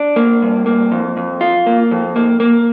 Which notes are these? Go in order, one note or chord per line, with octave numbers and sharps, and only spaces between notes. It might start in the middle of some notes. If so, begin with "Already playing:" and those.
Already playing: D4
A#3
G2
A#3
F2
F2
F4
A#3
F2
A#3
A#3